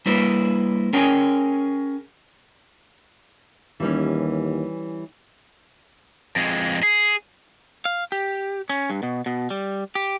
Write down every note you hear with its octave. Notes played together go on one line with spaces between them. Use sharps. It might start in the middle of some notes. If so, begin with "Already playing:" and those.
G3 A#3 E4 B4 C5
C#4 G#4 A#4 G5 G#5
D#2 E3 G3 C#4
F2 G#3
G#4
F5
G4
C#4
G2
B2
B2
G3
G4